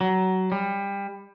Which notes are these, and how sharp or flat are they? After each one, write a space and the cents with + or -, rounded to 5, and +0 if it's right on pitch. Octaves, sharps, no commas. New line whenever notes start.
F#3 +20
G3 +25